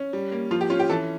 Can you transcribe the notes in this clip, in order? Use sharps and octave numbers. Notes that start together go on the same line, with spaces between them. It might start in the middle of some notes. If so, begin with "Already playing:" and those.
Already playing: C#4
G3
A#3
F3 F4
G4
C#4 F4
G4
E3 A4